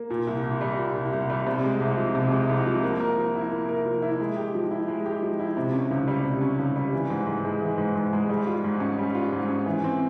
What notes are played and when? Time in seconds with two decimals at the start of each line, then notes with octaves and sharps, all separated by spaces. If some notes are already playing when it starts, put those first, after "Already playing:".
Already playing: A#3
0.10 A#2
0.27 C2
0.43 C2
0.61 G3
0.78 A#2
0.95 C2
1.13 C2
1.30 G3
1.47 C3
1.64 G#3
1.80 C2
1.97 F3
2.15 C3
2.31 G#3
2.49 C2
2.66 F3
2.83 A#3
3.00 A#4
3.18 F3
3.35 E4
3.52 A#3
3.69 A#4
3.85 F3
4.02 E4
4.20 G#3
4.37 G4
4.54 F3
4.71 E4
4.88 G#3
5.06 G4
5.23 F3
5.39 E4
5.57 C3
5.74 C#4
5.91 C#2
6.08 G3
6.24 C3
6.41 C#4
6.59 C#2
6.76 G3
6.93 E3
7.10 G#2
7.27 G#2
7.45 G#3
7.62 E3
7.78 G#2
7.96 G#2
8.13 G#3
8.29 G3
8.47 F4
8.64 G#2
8.80 C#4
8.98 G3
9.15 F4
9.33 G#2
9.49 C#4
9.66 E3
9.84 C4